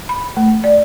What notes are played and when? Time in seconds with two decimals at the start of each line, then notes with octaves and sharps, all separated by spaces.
0.09 B5
0.37 A3
0.64 D5